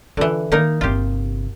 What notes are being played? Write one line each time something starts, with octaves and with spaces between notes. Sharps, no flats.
D3 E3 F4
D#3 A#3 D#4 A#4
G1 C3 F4 G4